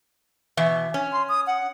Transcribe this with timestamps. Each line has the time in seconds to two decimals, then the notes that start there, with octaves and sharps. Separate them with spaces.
0.57 B2 E3 E5
0.94 C#4
1.13 C6
1.29 D#6
1.47 F#5